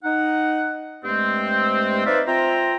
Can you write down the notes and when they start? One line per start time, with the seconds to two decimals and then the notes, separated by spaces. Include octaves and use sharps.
0.03 D#4 F#5
1.04 G2 G#3 A3 C4
2.05 D#4 B4 C5 D5 E5 F5
2.27 C4 F4 E5 G5 A#5